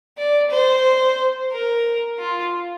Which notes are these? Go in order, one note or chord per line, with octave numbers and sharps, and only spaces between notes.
D5
C5
A#4
F4